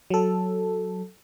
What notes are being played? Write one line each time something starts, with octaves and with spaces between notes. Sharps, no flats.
F#3 A4